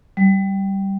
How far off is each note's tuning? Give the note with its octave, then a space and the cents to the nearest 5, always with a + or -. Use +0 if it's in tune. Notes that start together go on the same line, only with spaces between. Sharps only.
G3 -5